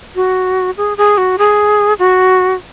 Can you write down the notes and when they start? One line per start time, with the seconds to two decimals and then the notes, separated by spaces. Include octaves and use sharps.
0.16 F#4
0.77 G#4
0.97 G#4
1.18 F#4
1.38 G#4
1.99 F#4